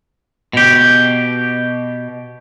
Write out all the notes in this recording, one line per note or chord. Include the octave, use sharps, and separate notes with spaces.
B2 G4